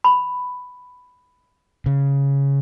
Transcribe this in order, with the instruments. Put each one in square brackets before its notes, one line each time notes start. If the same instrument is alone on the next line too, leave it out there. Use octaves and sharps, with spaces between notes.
[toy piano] B5
[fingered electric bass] C#3